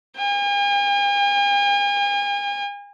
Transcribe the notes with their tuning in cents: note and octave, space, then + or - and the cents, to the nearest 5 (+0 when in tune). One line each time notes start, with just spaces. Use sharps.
G#5 -45